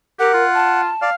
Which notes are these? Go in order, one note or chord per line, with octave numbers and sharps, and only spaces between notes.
G4 A#4 F#5
F4
A5
D5 F5